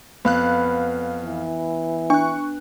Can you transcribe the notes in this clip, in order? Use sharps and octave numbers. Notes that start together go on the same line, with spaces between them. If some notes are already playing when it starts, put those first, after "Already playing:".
F2 B3 F5 F#6
E3
D4 C#6 F#6